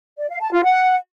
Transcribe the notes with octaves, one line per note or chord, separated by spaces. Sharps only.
D5
F5
A5
F4
F#5